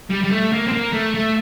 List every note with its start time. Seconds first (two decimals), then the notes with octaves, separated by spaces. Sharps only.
0.10 G3
0.23 G3
0.30 A3
0.52 A#3
0.67 C4
0.72 A#3
0.93 A3
1.14 A3